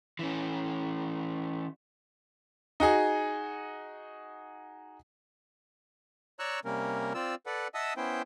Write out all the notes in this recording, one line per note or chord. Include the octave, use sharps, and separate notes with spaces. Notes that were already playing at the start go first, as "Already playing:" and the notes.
E3 C#4
D#4 F#4 G#4
C#5 D5 A#5 C#6 E6 F#6
C3 G3 A#3 C#4 A#4
C4 F4 D5 E6
A4 B4 D5 F#5
D#5 E5 F#5 A5 D#6 E6
B3 C#4 E4 C5 G5